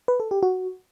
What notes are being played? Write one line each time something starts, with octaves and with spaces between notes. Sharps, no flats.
B4
A4
G4
F#4